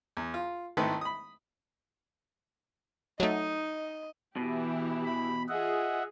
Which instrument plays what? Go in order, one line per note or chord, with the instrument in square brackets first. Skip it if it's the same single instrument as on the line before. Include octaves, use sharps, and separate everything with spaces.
[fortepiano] E2
F4
G#1 D#3 A3 E4 A4 B4
B5 D#6
[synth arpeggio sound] F#3 A3 [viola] D#4 [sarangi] D#5
[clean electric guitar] B2 [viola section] E3 E4 G4
[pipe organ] B5
[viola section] F4 G#4 [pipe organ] D#5 E5 F#5